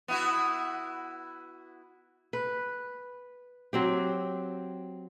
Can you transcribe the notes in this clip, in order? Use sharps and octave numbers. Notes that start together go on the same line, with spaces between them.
B3 E4 F#4
B4
F#3 C4 G4